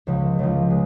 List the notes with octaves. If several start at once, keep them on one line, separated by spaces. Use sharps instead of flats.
C#2 C#3 F3
C#2 C#3 F3
G#3